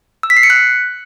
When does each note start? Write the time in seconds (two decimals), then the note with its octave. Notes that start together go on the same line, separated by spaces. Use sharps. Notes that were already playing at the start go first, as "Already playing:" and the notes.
0.23 E6
0.30 B6
0.37 C7
0.43 C#7
0.50 F#6